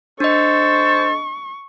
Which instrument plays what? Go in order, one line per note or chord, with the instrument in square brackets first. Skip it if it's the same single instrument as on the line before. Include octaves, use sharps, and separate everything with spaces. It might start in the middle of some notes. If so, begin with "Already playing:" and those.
[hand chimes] D4 D#5 [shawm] A4 [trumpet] C5 [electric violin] C#6